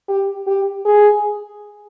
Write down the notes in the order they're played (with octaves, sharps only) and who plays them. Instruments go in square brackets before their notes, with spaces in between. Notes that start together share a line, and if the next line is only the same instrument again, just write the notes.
[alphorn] G4
G4
G#4